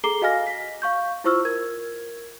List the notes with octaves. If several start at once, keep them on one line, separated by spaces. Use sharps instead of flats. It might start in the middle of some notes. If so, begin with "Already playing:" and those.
G#4 A4 A#5 D6 C7 G7
F#4 D#5 F5 G#5 F6 A#6
B6
F5 C#6 G6
E4 F4 C5 C#6 E6 F6
A#4 G#6